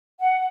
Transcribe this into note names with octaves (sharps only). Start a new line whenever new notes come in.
F#5